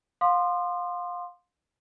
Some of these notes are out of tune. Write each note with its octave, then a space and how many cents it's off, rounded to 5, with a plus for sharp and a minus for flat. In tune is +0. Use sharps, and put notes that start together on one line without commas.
F5 +30 C6 +0 D#6 -45